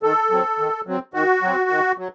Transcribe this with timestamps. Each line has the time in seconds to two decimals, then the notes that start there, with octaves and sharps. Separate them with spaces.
0.03 D#3 A4
0.31 F#3 C4
0.59 D#3
0.87 F#3 C4
1.14 D#3 F#4
1.42 F#3 C4
1.70 D#3
1.98 F#3